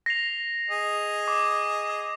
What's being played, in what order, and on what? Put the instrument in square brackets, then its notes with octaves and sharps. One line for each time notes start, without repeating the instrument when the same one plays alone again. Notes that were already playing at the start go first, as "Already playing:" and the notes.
[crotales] A#6 C7 F7
[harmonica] G#4 D#5
[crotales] D6